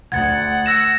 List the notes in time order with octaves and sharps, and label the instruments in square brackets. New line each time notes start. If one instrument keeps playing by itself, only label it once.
[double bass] D2 [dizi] F#5 [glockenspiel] G#6 A6
[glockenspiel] E6 A#6 E7